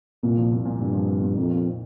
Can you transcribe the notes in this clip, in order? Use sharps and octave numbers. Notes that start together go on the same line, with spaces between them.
C2 A#2
F3
C2
A#2
C2 G2
F3
C2
A#2
F2 D#3
A#3
D#3